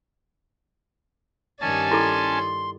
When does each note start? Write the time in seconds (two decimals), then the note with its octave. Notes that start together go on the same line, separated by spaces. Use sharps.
1.61 G2 D#3 C#4 D5 G#5 A5
1.91 E4 A4 C6 D6